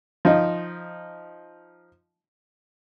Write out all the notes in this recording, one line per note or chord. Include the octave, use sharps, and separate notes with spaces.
F3 D#4